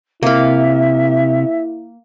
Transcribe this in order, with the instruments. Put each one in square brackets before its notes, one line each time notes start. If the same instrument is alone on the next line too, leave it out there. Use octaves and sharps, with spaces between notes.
[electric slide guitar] C3 [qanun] A#3 F5 [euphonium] E4 [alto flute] E5